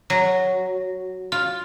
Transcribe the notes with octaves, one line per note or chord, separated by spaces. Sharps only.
F#3
F4